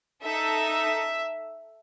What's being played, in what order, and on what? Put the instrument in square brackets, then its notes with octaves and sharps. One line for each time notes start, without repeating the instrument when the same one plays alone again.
[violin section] D#4 A4 E5